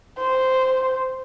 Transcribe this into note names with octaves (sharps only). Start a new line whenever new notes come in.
C5